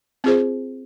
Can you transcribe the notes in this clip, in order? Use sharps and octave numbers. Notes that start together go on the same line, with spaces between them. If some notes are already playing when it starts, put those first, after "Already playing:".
C4 F4 G#4 C5